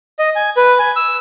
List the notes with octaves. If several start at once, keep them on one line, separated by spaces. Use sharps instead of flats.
D#5
G#5
B4
G#5
E6